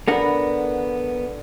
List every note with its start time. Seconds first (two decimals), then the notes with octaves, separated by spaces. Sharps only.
0.08 D3 B3 A#4 F#5 B5